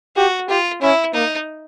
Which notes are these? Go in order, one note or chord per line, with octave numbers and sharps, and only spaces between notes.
F#4 G4
F4 G4
C#4 E4
A#3 D#4